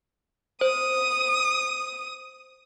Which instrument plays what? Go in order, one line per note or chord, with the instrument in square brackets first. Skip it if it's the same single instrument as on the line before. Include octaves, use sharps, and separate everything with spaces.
[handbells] C5 [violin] D#6